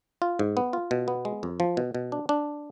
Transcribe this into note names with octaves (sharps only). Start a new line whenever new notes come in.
F4
G#2
B3
F4
B2
B3
G#3
F2
F3
B2
B2
D4
D4